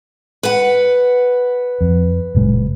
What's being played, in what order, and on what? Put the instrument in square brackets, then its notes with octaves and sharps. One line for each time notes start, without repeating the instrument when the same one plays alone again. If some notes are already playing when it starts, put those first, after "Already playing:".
[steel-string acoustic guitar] B4 F#5
[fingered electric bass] F2
F#1 A#2 G#3